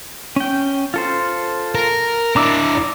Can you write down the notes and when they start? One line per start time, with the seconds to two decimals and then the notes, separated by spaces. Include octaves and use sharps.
0.36 C#4 G5
0.94 F4 A4 C5
1.75 A#4
2.36 D4 E4 A#5 D6 E6